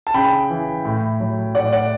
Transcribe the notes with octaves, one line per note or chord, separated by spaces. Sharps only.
A5
C#3 G5 B5
E3
A2
F#3
A2 D5 F#5
D5 F#5